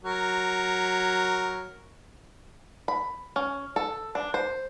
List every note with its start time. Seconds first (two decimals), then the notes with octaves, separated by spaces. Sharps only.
0.05 F#3 A#4
2.88 B5
3.36 C#4
3.76 A4
4.15 D4
4.34 C5